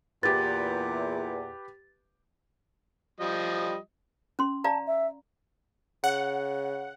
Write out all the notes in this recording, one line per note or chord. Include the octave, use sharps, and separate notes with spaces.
E2 A#2 G4 B4 A6
F3 G3 D#5
C#4 C6
D5 F5 A5 A#5
E5
C#3 F#5